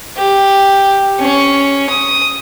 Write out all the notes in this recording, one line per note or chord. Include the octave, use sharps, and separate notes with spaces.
G4
C#4
D#6